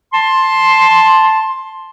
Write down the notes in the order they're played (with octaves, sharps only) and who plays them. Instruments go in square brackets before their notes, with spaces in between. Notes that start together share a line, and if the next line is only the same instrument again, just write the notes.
[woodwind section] A5 C6